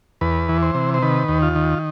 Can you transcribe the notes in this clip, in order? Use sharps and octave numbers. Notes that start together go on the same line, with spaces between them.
E2 B4
E3
C5
C3
C5
D#3 B4
D#2
F4
D#3